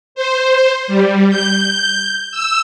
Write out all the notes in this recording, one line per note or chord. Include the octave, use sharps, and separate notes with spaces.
C5
G3
G6
E6